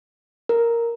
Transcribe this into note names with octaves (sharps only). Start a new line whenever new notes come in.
A#4